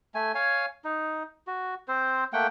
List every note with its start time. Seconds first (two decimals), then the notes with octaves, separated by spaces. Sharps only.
0.15 A3 G#5
0.35 C#5 F5 G#5
0.84 D#4
1.47 F#4
1.88 C4 C5
2.33 A3 A#3 F#5 G5